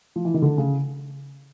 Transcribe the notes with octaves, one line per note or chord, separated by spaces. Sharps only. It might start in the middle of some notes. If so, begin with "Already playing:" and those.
F3
E3
D#3
D3
C#3